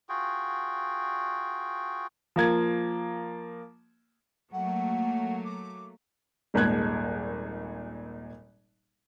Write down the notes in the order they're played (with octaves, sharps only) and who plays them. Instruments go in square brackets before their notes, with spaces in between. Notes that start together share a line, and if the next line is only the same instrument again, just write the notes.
[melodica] F4 F#4 G#4 G5
[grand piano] F3 A#3 G#6
[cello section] F#3 A3 A#3 [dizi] F#5
[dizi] D6
[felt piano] D#1 G#1 A#2 G#3 F#6 G#6